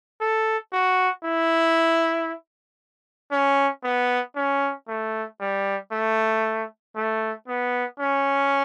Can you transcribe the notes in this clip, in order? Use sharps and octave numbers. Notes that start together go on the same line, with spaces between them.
A4
F#4
E4
C#4
B3
C#4
A3
G3
A3
A3
B3
C#4